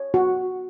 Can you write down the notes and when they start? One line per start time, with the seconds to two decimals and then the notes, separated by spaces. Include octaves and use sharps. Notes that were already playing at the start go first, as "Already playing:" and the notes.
Already playing: C#5
0.14 F#4